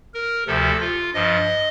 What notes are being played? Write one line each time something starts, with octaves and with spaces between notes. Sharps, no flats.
A#4
D2 C3 F3 A4
F4
G2 F3 D#5